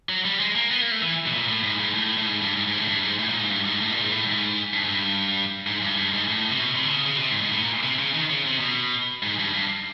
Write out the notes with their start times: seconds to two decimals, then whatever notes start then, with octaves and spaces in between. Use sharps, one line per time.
0.09 F#3
0.25 G3
0.40 G#3
0.55 A#3
0.71 B3
0.81 A#3
0.91 A3
1.02 E3
1.26 B2
1.33 A#2
1.48 A2
1.64 G#2
1.79 G#2
1.94 A2
2.17 A2
2.26 G#2
2.41 G2
2.57 G#2
2.67 G#2
2.77 A2
2.88 G2
3.03 G#2
3.19 A2
3.29 A#2
3.39 G#2
3.50 G2
3.65 G#2
3.81 A2
3.91 A#2
4.01 G#2
4.11 A2
4.27 G#2
4.73 G2
4.84 G#2
4.89 G2
5.67 G#2
5.82 G2
5.97 G2
6.13 G#2
6.29 A2
6.49 C3
6.59 B2
6.75 C3
6.84 D3
6.90 C#3
7.06 C#3
7.17 B2
7.21 C3
7.31 G#2
7.42 G#2
7.52 A2
7.63 A#2
7.83 C3
7.99 C#3
8.14 D#3
8.30 C#3
8.45 C3
8.61 B2
9.23 G#2
9.39 G2
9.53 G2